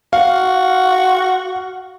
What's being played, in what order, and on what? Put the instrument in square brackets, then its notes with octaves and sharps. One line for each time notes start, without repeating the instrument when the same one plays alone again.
[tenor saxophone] F#4 [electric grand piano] F5